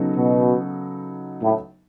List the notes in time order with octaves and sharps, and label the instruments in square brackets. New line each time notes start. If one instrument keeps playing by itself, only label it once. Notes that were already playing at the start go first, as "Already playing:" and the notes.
Already playing: [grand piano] C#3 F#3 B3 D#4 A4
[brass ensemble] B2
A2